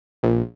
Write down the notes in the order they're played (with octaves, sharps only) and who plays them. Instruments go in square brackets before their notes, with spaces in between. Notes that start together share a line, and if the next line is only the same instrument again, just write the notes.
[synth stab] A#1